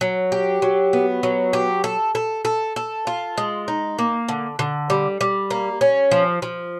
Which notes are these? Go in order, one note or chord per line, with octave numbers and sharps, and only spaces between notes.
F#3
G4
F#3
B3
F#3
G4
A4
A4
A4
A4
F4
G#3
D#4
A#3
D3
D3
G3
G3
A#3
C#4
F3
F3